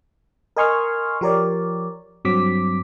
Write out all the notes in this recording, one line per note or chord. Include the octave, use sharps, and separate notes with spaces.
A#4 D#5 G#5 C6 C#6 F6
F3 G4 A#4 C#5 D5
G2 F#3 C4 D6 B6